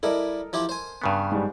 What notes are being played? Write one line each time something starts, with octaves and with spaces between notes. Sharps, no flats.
G3 E4 A4 A#4 D#5
F3 E4 G4
C5 G#5
G2 C#3 B3
G#2 G3